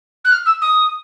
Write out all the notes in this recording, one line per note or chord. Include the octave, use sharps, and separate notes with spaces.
F#6
F6
E6
D#6